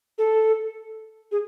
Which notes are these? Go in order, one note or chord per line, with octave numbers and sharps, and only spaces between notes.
A4
G#4